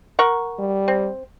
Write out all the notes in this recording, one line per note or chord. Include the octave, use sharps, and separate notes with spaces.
A#4 F#5 C#6
G3
C4